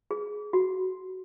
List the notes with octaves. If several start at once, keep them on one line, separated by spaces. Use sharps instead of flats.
G#4
F#4